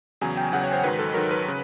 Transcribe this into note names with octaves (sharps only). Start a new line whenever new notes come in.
E2 C#3 F#3 G#5
G5
E2 C#3 F#3 F#5
C#5
C5
G#2 D#3 F#3 B4
A4
G#2 D#3 F#3 A#4
B4
C#3